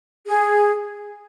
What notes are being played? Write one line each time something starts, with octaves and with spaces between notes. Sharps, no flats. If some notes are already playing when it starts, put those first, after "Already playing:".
G#4